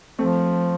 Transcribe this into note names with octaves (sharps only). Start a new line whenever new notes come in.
F3 A3 C4